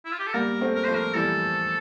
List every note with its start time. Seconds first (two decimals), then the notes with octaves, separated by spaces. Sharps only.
0.05 E4
0.12 F4
0.19 G4
0.27 A4
0.33 G3 A#3 A#4
0.61 A3 C4
0.74 A#4
0.85 F3 A3 C5
0.95 A#4
1.14 E3 G3 A4